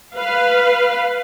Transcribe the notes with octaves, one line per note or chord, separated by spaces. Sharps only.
B4 F5